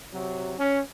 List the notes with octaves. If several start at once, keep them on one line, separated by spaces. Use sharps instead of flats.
C3 F#3
C#4